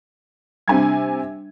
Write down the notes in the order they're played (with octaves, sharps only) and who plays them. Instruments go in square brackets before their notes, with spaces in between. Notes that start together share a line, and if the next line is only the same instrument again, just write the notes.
[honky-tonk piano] C3 G#5 G#6 [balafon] G3 D4